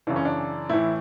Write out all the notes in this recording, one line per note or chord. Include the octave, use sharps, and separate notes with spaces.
F#2 C#3 E3 D4
C#4
D4
A2 E3 E4